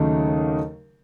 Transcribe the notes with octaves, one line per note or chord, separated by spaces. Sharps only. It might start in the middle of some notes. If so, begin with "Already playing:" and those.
Already playing: D#2 C#3 F#3 A3 D#4